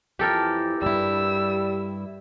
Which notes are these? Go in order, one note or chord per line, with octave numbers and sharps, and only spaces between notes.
F2 E3 G4 A4 A#4
G2 G3 E4 E6